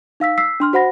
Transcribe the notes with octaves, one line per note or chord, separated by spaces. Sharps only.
D#4 F5 E6 B6
E6 B6 C7
D4 C6 F6
F#4 C5 F#5 B5 A#6